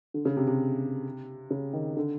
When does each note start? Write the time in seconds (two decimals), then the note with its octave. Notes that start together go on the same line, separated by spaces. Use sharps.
0.14 D3
0.25 C#3
0.37 C3
0.47 C3
1.50 C#3
1.73 D#3
1.97 D3